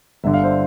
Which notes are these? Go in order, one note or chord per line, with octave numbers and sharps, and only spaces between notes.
G1 G2 D3 E5
F5
C5 E5